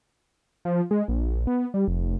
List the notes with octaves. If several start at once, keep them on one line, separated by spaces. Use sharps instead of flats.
F3
G#3
A#1
B3
G3
F1